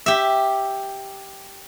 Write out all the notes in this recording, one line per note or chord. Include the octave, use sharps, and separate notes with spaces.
G4 E5